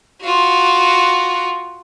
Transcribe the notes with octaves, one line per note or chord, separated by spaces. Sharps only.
F4 F#4